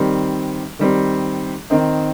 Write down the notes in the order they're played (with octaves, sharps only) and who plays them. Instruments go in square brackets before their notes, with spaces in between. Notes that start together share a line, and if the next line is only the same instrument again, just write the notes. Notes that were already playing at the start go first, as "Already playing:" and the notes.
Already playing: [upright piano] D#3 G3 C4
D#3 G3 C4
D#3 C4 D#4